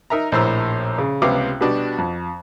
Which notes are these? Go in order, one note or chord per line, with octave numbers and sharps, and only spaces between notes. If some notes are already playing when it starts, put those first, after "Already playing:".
D#4 A#4 E5 A#5
A#1 A2 C5 A#5 E6
C#3
C#2 C3 B3 C5 F5 D6
B2 G3 B3 D4 F#4
F2